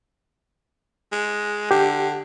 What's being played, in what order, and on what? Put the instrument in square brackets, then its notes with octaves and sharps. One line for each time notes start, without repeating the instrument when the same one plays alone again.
[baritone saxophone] G#3
[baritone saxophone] D3 [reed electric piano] G4